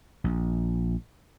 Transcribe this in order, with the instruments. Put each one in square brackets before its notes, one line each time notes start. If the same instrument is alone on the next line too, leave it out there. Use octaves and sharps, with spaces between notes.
[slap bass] A#1